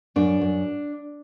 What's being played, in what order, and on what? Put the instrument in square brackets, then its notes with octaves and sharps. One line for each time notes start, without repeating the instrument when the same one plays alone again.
[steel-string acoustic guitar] F#2 D4
F#2